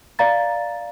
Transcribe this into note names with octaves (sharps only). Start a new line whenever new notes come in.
D5 F5 A#5 A6